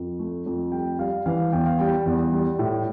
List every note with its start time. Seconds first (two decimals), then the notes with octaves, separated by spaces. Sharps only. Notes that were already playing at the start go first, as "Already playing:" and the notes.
Already playing: F2
0.19 A3
0.46 F2
0.72 G3 G5
0.99 G3 F5
1.26 E3 F5
1.52 E2 G5
1.66 F5
1.79 G3 G5
2.06 E2
2.32 G3
2.59 A2